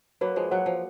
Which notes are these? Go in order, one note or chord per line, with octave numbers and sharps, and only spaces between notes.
F#3 A#3 B4
F3 G#3
F#3 F#5
F3